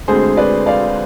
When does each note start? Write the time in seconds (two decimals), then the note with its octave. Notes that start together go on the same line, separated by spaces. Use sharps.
0.08 D2 D3 G#3 C4 G#4 C5
0.37 B4 D5
0.66 D5 F5